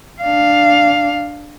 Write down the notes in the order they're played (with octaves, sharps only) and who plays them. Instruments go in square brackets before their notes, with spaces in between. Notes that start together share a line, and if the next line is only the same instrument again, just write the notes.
[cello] D4 F5